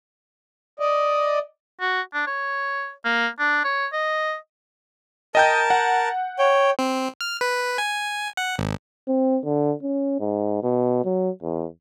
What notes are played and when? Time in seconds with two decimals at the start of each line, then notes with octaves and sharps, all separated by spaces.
0.80 D5 D#5
1.81 F#4
2.14 D4
2.27 C#5
3.05 A#3
3.39 D4
3.64 C#5
3.93 D#5
5.35 A#4 D#5 G5 A5 G6
5.70 F#5
6.39 C#5 G5
6.79 C4
7.21 F6
7.41 B4
7.78 G#5
8.37 F#5
8.59 G#1
9.08 C4
9.45 D3
9.82 C#4
10.20 G#2
10.63 B2
11.05 F#3
11.43 E2